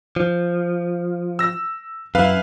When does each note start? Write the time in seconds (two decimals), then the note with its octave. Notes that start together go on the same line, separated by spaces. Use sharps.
0.16 F3
1.39 E6 A#6
2.15 F#2 E4 B4 F5